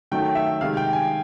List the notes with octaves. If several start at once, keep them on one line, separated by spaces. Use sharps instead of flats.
D#3 F#3 A3 G5
E5
C3 D#3 G#3 F5
G5
G#5